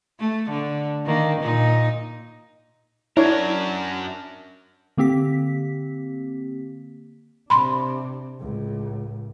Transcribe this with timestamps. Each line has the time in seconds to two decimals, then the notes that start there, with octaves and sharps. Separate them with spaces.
0.19 A3
0.50 D3
1.06 D#3 A#3
1.41 A#2 D#4
3.17 F#2 D4 E4 A#4 C#5
4.97 D3 A#3 C4 G4 B6
7.50 C3 D4 B5 C6
8.40 C#2 A2